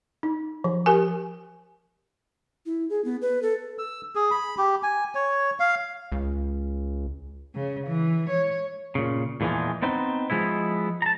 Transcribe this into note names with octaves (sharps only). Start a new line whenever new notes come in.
D#4
F3
G4 A#4 G#5
E4
G#4
B3
B4
A4
E6
G#4
B5
G4
G#5
C#5
F5
C#2
C#3
E3
C#5
A#2 C#3
E2 A#2 E3 F3 G#3
B3 C4 D#4 B4 C5
F3 G#3 B3 E4
A5 A#5